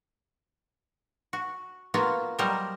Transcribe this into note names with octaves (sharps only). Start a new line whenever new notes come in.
F#4
A#3 B3 F4 F#4
F#3 G3 A#4 C5 D#5